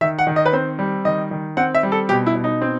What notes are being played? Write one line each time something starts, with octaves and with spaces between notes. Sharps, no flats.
D#3 E5
F#5
D#3
D#5
B4
C4 C5
G3
D#3 D#5
D#3
C4 F#5
E5
G3
A4
B2 G4
E4
B2
D#4
C4